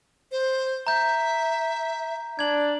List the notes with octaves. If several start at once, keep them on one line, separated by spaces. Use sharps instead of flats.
C5
E5 A#5 G6
D4 G#6 F#7